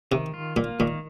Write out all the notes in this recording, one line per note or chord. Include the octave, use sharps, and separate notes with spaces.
C3 D#3
F4
A#2 A#3
A#2 D#3